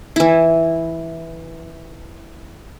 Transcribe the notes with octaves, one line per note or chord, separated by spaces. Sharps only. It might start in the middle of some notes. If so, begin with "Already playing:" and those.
E3 E4